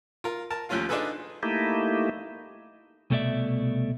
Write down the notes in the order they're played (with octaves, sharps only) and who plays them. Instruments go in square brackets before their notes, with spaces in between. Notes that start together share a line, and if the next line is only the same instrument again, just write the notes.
[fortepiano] F4 A#4
A#4 A5
D#2 F3 A3 C#4 F4 F5
D4 D#4 F4 G#4 A4 B4
[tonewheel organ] A3 A#3 D#4 E4 G4
[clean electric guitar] C2 B2 A3 B3 D5 E5